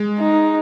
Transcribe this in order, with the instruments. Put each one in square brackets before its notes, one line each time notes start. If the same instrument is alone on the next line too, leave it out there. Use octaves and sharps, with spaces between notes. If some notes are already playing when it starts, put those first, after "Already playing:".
Already playing: [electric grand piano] G#3
[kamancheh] D#4